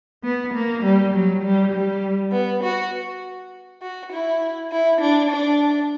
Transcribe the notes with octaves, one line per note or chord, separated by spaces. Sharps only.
B3
A#3
G3
F#3
G3
G3
B3
F#4
F#4
E4
E4
D4
D4